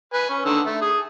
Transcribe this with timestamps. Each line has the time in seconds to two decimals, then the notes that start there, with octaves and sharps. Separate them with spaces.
0.13 B4 G#5
0.29 C#4
0.46 D3 D#3 E6
0.66 A3
0.81 G#4 D#6